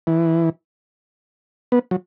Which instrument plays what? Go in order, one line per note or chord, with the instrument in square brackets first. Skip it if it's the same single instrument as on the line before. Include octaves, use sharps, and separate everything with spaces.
[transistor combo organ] E3
B3
F#3